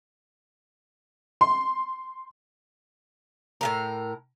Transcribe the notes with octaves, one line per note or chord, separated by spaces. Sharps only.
C6
A2 F3 A#4